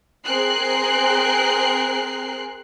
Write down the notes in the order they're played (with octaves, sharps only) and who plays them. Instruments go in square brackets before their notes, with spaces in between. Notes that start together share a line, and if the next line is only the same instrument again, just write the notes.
[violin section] C4 G#4 A#4 F#6 C7